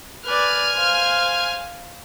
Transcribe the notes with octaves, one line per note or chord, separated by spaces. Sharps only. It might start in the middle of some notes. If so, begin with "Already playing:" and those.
B4 D5 G#5 F6
C5 F5